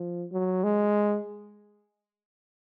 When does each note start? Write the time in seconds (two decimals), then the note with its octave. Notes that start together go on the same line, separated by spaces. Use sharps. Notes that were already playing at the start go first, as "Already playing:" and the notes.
Already playing: F3
0.32 F#3
0.64 G#3